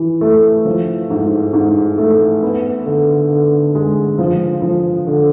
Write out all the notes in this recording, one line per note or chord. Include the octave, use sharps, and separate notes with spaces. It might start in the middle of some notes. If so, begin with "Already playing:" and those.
Already playing: E3
A3
F3
G#2
G#2
A3
B3
D3
D3
G#3
F3
F3
D3